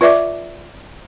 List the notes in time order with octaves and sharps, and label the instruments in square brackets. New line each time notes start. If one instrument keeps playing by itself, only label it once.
[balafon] F4 B4 D5 E5 D6